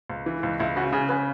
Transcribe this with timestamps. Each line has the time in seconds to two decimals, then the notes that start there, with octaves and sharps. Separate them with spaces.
0.10 C#2
0.26 E3
0.43 C#2
0.60 C#2 E4
0.76 C#3 F#4
0.93 C#3 G#4
1.09 C#3 B4